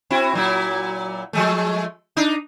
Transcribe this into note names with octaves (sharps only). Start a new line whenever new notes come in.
C4 E4 F#4
A#2 F#3 E4
F3 G#3 A3
D4 D#4